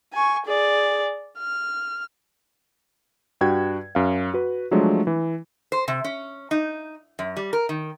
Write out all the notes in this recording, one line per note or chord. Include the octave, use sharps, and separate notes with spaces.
G#5 C#6
G#4 D5
F6
G2 F#4 G5 G#6
F#2 F5
F#4 B4
F3 F#3 G#3 A3 D4
E3
C5
C3
C#4
D#4
F#2
G3
A#4
D#3